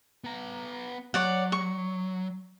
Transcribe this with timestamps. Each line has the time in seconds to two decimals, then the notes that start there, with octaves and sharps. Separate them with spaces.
0.24 B3 A#5
1.14 F#3 C#5 D5 F#5
1.52 C#6